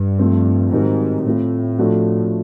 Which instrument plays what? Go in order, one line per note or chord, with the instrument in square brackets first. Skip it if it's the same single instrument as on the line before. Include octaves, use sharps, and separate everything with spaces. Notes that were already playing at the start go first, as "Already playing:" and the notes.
Already playing: [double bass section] G2
[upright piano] F3 A3 C4
[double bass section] G#2 [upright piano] D#3 G3 C4 D#4 F#4
[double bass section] A2 [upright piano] A3 C4 F4
[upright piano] F3 A3 D4 F#4 A4